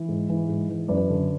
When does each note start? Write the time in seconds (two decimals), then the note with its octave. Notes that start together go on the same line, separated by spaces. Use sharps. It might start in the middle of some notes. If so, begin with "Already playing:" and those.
Already playing: E3
0.09 G#2
0.30 E3
0.49 G#2
0.69 E3
0.88 F#2 B4 D5
1.09 D3